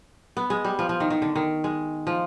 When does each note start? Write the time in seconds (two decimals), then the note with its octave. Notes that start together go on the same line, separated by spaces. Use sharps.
0.37 B3
0.50 G#3
0.64 G3
0.79 F3
0.89 F3
1.00 D#3
1.10 D#3
1.22 D3
1.36 D#3
1.64 G#3
2.07 F3